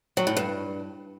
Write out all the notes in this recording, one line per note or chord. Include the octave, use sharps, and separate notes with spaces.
F#3
A2
G2